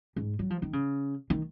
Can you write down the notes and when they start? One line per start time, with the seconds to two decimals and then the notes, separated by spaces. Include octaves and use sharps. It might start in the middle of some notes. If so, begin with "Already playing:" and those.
0.16 G#2
0.39 F#3
0.50 F3
0.62 D#3
0.73 C#3
1.30 D#3